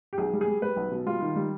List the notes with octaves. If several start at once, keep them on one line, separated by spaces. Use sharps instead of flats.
G4
B1 G#4
G3
G#4
G3
G3 B4
B1
B2
G3 F4
D#3
G3